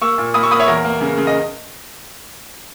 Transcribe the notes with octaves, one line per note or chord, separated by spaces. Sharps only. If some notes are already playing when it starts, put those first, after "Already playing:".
A#3 C#6 E6
A#2
A#3 B5 D#6
C#6 E6
A#3 B5 D#6
C#5 E5
E2 A#4
A#3
C#3
C#3
D#5